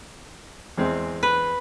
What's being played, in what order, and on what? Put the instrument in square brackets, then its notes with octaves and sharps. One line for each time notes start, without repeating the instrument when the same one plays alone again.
[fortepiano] E2 G#3 C4
[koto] B4